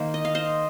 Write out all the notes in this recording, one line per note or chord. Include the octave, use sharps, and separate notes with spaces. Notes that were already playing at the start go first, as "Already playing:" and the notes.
Already playing: D#3 A#3 C5
D#5
F5
C5 D#5